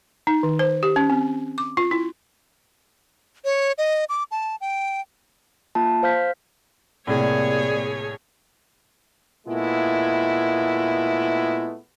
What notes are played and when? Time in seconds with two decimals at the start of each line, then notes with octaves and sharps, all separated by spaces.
0.27 D#4
0.43 D#3
0.59 C5
0.83 G4
0.96 C#4
1.10 C4
1.58 D6
1.77 F4
1.91 E4
3.45 C#5
3.78 D#5
4.09 D6
4.31 A5
4.61 G5
5.75 A#3 F4 A5
6.03 C5 F5 F6 G6 B6
7.07 C2 A2 C3 A#3 G#4 C#5 D5
9.47 A#2 G#3 A3 B3 E4